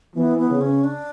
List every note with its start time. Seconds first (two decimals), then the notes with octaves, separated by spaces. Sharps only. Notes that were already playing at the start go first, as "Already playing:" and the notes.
0.15 E3 B3
0.38 B3
0.49 C#3
0.61 C#4
0.84 D4